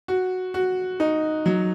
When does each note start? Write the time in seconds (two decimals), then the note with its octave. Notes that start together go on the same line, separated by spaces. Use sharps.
0.08 F#4
0.54 F#4
1.00 D#4
1.46 F#3